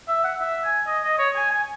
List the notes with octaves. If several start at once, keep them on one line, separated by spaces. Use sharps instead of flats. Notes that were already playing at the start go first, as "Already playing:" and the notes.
E5
F#5
E5
G#5
D#5
D#5
C#5
G#5
G#5